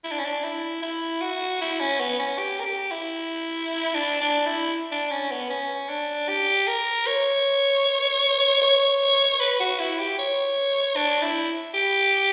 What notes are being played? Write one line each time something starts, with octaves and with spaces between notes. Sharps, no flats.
E4
D4
C#4
D4
E4
E4
F#4
E4
C#4
B3
C#4
G4
A#4
G4
E4
D4
D4
E4
D4
C#4
B3
C#4
D4
G4
A#4
C#5
C#5
B4
F#4
E4
G4
C#5
D4
E4
G4